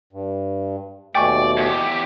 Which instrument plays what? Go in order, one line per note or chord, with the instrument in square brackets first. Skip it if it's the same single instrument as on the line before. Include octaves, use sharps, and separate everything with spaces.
[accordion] G2
[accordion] D#2 B2 A3 [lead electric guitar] D5 [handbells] G5 G#5 C#6
[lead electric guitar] E2 G4